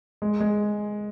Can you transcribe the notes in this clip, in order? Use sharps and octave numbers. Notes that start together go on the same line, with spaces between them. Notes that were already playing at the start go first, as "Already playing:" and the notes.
G#3
G#3